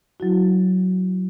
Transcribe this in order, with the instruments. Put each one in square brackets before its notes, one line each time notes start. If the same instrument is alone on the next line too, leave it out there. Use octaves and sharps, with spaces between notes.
[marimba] F#3 E4 F#4